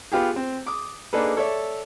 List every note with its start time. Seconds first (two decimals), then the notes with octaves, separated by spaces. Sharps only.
0.12 B3 F4 G4 G#4
0.36 C4
0.66 D6 D#6
1.13 A#3 D4 D#4 G#4 A4 B4
1.37 A4 C#5 D5 E5